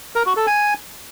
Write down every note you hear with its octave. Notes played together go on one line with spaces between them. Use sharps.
A#4
F#4
A4
G#5